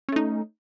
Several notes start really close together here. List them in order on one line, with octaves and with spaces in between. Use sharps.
C#4 A3 D#4